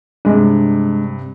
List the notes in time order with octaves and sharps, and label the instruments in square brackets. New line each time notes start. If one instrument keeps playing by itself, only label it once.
[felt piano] G2 C3 [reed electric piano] G#3 D4